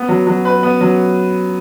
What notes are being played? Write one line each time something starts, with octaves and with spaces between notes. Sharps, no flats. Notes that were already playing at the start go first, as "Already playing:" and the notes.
Already playing: B3
F#3
F#3
B4
B3
F#3